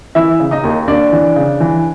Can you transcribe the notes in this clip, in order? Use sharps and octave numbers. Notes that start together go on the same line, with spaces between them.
E3 E4 E5
C#3
D#4 D#5
D#2
D#2 D4 D5
E3
C#3
E3